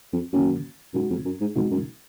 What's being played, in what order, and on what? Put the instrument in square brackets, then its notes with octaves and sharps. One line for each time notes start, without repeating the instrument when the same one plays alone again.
[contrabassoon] F2
[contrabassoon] F#2 [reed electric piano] D#3 A#3 C#4 F#4
[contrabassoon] F#2 [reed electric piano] B2 G#3 D#4 F#4
[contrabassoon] F2
F#2
G#2
[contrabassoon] F2 [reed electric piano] B2 G#3 D#4 F#4
[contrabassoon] F#2